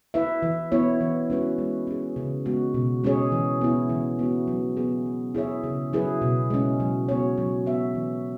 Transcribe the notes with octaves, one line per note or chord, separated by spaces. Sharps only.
E4 B4 E5
E3
B3 E4 C#5
E3
G#3 C#4 F#4 B4
G#3
C#4 G#4
C#3
G#3 B3 F#4
B2
G#3 C#4 G#4 C#5
E3
B3 E4
E3
B3 F#4
F#3
B3 G#4
F#3
E4 G#4 C#5 E5
C#3
F#3 E4 G#4 B4
B2
G#3 C#4
F#3
B3 F#4 C#5
F#3
B3 F#4 E5
E3